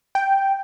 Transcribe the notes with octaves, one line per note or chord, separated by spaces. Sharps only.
G5